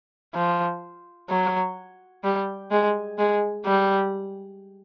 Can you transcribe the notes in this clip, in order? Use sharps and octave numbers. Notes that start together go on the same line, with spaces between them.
F3
F#3
G3
G#3
G#3
G3